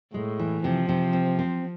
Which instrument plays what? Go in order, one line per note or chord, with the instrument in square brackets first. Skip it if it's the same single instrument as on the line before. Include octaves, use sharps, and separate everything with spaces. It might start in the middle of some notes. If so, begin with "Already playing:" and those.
[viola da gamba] A2 [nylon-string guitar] G#3
[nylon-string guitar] E3
[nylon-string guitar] C3 [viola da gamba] F3
[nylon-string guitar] C3
C4
C4